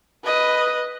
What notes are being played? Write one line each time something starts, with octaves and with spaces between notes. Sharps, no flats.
B4 D#5